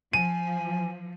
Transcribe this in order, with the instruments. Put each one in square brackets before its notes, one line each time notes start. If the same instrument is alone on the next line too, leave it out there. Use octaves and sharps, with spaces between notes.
[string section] F3 [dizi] G#5 [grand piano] D#7